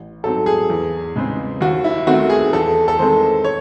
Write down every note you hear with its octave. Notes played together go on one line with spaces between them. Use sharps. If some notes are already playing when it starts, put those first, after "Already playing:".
Already playing: A1
G#2 F#3 C4 A4
G#4
E2
C#3 G#3 C4
D#2 F#4
E4
D#3 A3 C4 F#4
G#4
E2 A4
A4
D#3 G#3 C4 C5
C#5